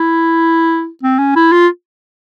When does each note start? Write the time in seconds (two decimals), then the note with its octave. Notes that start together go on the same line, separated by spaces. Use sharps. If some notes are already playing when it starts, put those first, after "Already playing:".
Already playing: E4
1.03 C4
1.19 C#4
1.36 E4
1.53 F4